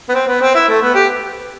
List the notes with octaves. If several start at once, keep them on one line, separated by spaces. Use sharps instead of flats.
B3
C4
B3
C4
E4
A3
B3
G4